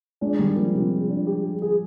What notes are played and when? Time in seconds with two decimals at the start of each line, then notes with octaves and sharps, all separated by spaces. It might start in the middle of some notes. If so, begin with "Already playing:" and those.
0.21 G#3 D4
0.39 D#3 G3
0.56 F3 A#3
0.75 C3
0.92 G#3
1.09 D4
1.27 G4
1.44 G#3
1.62 G#4